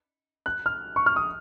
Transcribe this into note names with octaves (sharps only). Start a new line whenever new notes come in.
F#6
F6
C#6
F6
D#6